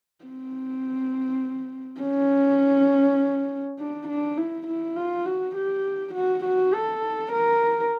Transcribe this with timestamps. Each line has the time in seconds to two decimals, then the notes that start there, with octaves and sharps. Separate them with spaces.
0.25 C4
2.01 C#4
3.79 D4
4.08 D4
4.38 E4
4.67 E4
4.96 F4
5.26 F#4
5.56 G4
6.14 F#4
6.45 F#4
6.74 A4
7.33 A#4